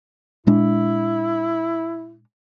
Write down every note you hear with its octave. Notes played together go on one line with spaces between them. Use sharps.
A#2 G#3 D4 E4